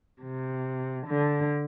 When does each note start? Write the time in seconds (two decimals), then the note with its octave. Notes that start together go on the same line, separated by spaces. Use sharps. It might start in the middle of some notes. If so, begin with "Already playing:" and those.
0.22 C3
1.07 D3